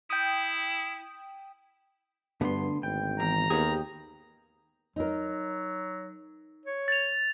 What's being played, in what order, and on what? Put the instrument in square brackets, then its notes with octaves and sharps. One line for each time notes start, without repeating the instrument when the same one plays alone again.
[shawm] E4 [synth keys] G5 D#6
[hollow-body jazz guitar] D2 B3 [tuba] G2 [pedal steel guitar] D3 C6
[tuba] G#1 [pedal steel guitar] G5
[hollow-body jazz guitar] E2 [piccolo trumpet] A#5
[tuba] D#2 [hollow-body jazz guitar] D#3 B3 G#4 [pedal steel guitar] G4 D#6
[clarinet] F#3 [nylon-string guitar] D#4 A#4
[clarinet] C#5
[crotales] A6 F7